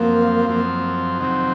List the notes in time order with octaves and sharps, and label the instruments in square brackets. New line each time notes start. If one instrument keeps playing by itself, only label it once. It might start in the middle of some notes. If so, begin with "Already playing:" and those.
Already playing: [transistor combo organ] F#2 F3 C4 [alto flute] A#3
[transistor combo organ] F#2 F3 C4
F2 C3 D#3 F#3 C4